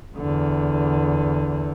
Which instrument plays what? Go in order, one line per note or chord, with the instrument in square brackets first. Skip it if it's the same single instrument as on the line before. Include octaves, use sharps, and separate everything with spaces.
[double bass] E2 D3